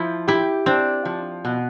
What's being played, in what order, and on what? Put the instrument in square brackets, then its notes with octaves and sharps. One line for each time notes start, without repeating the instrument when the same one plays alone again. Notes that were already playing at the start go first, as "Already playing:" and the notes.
Already playing: [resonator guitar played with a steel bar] F3 [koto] E4
[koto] E4 [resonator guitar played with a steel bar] G4
[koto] C4 [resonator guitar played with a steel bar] D4
[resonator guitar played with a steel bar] F3
B2